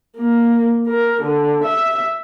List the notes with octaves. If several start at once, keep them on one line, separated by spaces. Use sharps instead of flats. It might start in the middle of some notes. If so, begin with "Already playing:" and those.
A#3
A#4
D3
E5